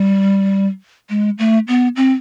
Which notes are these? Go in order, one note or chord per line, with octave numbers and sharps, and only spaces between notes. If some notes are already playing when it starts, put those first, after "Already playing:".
Already playing: G3
G#3
A3
B3
C4